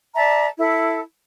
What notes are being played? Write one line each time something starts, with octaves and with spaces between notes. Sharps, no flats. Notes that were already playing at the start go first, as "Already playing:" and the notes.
D5 E5 A5 A#5
E4 A4